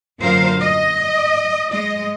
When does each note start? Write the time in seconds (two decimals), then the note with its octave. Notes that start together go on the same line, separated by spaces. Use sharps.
0.19 F#2 A#2 D3 A#4 C5 F5
0.61 D#5
1.70 G#3 D#5